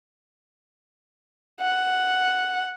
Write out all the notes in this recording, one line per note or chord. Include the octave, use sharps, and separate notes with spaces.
F#5